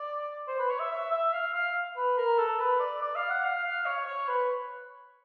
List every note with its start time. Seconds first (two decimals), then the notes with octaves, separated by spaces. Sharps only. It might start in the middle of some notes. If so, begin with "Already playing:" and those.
Already playing: D5
0.48 C5
0.59 B4
0.69 C#5
0.79 E5
0.90 E5
1.11 E5
1.33 F5
1.54 F5
1.96 B4
2.17 A#4
2.38 A4
2.60 B4
2.80 D5
3.01 D5
3.15 F5
3.29 F#5
3.43 F5
3.64 F5
3.86 C#5
4.06 C#5
4.28 B4